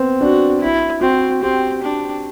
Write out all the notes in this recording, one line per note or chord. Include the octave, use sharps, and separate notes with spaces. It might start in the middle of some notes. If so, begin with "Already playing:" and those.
Already playing: B3 C4
D4 F#4
E4
C4 F#4
C4 G4
D4